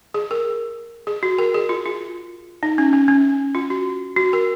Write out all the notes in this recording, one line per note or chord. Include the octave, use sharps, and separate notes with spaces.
G#4
A#4
G#4
F#4
A#4
G#4
F4
F4
D#4
C#4
C#4
C#4
F4
F#4
F#4
A#4